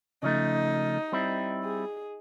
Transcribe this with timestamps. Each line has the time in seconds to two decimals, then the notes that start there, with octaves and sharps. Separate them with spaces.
0.23 C#3 F3 A3 D#4
1.12 G3 C4 E4
1.64 G#4